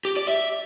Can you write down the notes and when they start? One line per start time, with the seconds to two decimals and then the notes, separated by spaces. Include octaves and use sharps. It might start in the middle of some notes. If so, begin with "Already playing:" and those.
0.05 G4
0.17 D5
0.28 E5